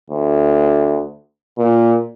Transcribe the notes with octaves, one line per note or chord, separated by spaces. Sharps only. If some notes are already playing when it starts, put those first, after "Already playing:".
D2
A#2